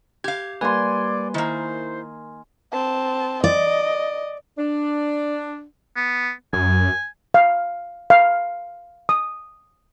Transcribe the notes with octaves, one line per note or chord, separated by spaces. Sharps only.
G4 F5 G#6
G3 A#3 B4 D5 G#5 C6
D#3 A#3 E4 C5
C4 A5
D5 D#5
D4
B3
F#2 G#5
F5
F5
D#6